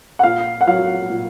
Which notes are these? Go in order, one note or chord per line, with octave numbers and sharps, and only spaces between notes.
F#5
A#2 F5
F#5
F#3 F5
A#2